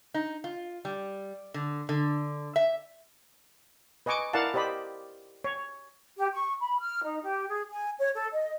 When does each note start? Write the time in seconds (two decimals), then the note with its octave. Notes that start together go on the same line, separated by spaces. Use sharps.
0.14 D#4
0.44 F4
0.85 G3
1.54 D3
1.89 D3
2.56 E5
4.06 B4 D#5 G#5 C#6 D6
4.33 E4 A#4 D5 F5 F#5 A5
4.54 G4 C5 D5 D#5 B5
5.44 C#5
6.16 G4
6.33 C#6
6.60 B5
6.80 F6
7.03 D#4
7.23 G4
7.48 G#4
7.70 G#5
7.98 C#5
8.14 A4
8.32 D#5